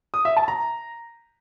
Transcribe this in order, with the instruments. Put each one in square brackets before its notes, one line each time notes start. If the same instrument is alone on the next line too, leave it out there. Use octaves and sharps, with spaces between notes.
[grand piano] D#6
E5
A5
A#5